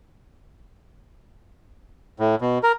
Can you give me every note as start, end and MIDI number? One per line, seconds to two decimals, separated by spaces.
2.19 2.35 45
2.41 2.58 47
2.63 2.72 70